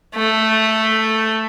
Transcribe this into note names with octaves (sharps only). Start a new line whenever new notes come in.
A3